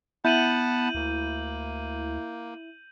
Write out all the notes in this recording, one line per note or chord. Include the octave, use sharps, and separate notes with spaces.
B3 E4 F#5 A5 B5 G6 D#7 F#7
D2 A#3